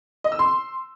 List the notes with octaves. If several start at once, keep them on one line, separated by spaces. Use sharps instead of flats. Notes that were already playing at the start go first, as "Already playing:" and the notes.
D#5
E6
C6